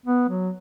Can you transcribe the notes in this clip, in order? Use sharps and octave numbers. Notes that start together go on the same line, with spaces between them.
B3
F#3